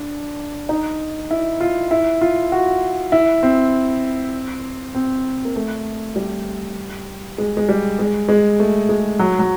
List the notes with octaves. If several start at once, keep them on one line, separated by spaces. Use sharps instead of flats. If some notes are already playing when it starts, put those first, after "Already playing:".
Already playing: D4
D#4
E4
F4
E4
F4
F#4
E4
C4
C4
A#3
A3
G3
G#3
G#3
G3
G#3
G#3
A3
G#3
F#3
F#3